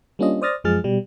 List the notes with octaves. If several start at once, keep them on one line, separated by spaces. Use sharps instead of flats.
G3 A#3 C#4 D4 F4 D#5
C5 D5 D#6 F6 A6 A#6
F#2 F3 G#3 G#4 F6 A6
B2 G3